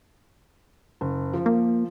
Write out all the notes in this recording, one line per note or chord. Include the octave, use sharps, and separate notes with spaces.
F#1
F3
A#3